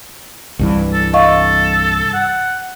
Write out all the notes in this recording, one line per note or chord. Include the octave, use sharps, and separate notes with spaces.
C2 G2 E3
A4
A4 D#5 F5 C#6
F#5